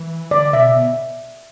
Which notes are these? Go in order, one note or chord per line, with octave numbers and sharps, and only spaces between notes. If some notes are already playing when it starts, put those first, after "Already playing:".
Already playing: E3
D3 D5
B2 E5
B2